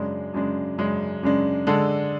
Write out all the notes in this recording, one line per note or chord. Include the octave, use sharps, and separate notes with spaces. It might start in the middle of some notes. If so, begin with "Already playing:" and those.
Already playing: F#2 C#3 G#3 D4
F#2 C#3 G#3 D4
F#2 C#3 G#3 D4
F#2 C#3 G#3 D4
D3 G#3 D4 A4